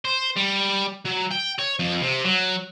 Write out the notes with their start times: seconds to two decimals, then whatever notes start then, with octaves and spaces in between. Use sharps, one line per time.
0.05 C5
0.36 G3
1.05 F#3
1.31 G5
1.59 C#5
1.79 F2
2.02 C3
2.24 F#3